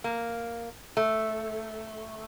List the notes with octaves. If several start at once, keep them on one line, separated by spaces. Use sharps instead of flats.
A#3
A3